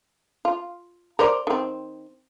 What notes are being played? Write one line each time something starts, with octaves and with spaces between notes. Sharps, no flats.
F4
A#4 C5 D5
D#3 C4